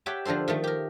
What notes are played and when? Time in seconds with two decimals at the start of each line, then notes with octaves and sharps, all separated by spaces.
0.06 G4 C#5 E5 F#5 G5 A5
0.25 D3 F3 D4 A4 C5
0.48 D#3 F3 A3
0.64 G4 A#4